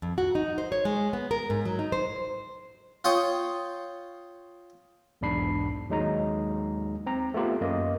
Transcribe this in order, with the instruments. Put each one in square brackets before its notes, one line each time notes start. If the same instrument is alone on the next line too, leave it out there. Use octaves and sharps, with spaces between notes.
[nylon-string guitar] F2
F#4
D#4
C5
C#5
G#3
B3
A#4
G#2
F#3
D#4
C5
[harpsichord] F4 C#5 G5 D#6
[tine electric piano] B1 E2 G#2 D4 B5 C7
D#2 F#3 G#3 D#4 A#5
C4 A#5
A3 B3 F4 G4
F#2 A#3 D#5